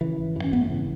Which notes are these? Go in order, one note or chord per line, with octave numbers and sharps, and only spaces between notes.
C#3 E3
G#1
F#2 E3
C#4
G#1 B3
A3
C#3 E3